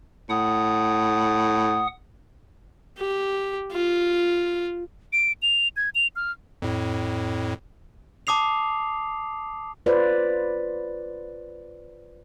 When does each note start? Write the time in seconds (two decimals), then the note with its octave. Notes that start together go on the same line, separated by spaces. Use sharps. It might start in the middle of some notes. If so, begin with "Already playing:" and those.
0.29 A2 F#5 D#6
2.98 G4
3.72 F4
5.13 D7
5.42 F7
5.76 G#6
5.95 F7
6.16 F6
6.62 F2 A2
8.27 A5 D6 D#6 C7 F7
9.86 F4 B4 C5 D5